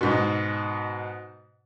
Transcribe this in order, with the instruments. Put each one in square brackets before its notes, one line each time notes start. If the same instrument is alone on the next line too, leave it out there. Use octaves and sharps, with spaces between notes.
[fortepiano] G#2 B2